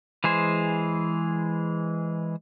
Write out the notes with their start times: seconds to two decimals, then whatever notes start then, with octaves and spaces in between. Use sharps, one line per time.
0.24 E3 G#3 G#4 C5